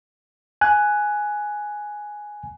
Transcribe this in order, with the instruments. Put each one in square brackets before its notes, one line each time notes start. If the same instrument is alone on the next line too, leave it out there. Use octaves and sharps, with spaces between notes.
[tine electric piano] G#5 F#6